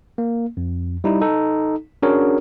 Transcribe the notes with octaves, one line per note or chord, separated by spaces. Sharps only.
A#3
F2
G3 D#4 E4
D#4 A4
C#4 D4 F#4 G#4 A#4 C#5